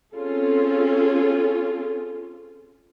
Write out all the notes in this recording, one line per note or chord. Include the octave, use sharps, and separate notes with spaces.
C4 C#4 F4 G#4 A4